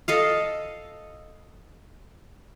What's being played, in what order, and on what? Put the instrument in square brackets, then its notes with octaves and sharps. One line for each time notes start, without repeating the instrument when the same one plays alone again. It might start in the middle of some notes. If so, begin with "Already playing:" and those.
[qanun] A4 D#5 F5